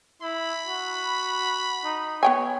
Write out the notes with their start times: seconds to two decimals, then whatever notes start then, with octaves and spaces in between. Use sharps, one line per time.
0.22 E4 B5
0.67 F#4
1.85 D#4
2.23 B3 C#5 G5 G#5